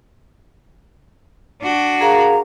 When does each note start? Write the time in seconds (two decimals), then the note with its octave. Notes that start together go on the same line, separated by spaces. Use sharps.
1.62 D4 F#4
2.01 G#4 A#4 F5 A#5